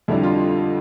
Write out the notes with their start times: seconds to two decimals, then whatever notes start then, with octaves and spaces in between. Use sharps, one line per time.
0.08 F2 D3 G3 E4
0.23 F4